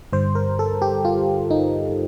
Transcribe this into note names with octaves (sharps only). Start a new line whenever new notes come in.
G2 D3 G3 C5
A#4
A4
G4
F4
D#4